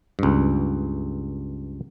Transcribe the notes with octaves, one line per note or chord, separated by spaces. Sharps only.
C#2 G2